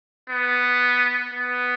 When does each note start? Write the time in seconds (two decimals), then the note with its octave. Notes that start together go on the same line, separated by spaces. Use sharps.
0.30 B3
1.34 B3